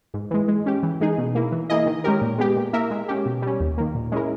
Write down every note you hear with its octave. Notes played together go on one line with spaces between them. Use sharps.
G#2
E3 G#3
G#3
C#4 G4
E3
G#3 D#4 G#4
B2
A#3 E4
E3
A#3 E4 G#4 D#5
D#3
G#3 C#4 G4 A#4
A#2
G#3 B3 G4
A#2
A#3 E4 A#4 E5
G#3
C#4 G4
B2
G3 C#4
D#2
D#3 A#3
A#2
G#3 C#4 E4 A#4